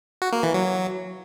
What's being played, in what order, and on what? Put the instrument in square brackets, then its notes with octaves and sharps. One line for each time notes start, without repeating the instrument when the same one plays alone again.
[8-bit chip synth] F#4
A#3
E3
F#3